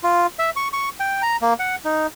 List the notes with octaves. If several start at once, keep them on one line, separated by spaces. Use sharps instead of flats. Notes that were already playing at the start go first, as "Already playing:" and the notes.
F4
E5
C#6
C#6
G5
A#5
A#3
F#5
D#4